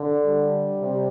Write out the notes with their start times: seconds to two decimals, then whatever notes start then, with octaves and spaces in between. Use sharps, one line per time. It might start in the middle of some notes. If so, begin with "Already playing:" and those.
Already playing: D3
0.26 G3
0.79 C3